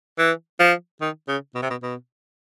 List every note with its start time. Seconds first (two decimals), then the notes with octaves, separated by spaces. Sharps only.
0.19 E3
0.60 F3
1.01 D#3
1.29 C#3
1.55 B2
1.63 C3
1.71 B2
1.83 B2